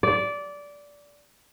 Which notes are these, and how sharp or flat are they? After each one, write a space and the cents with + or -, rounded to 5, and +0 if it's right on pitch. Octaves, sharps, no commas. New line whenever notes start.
D5 -15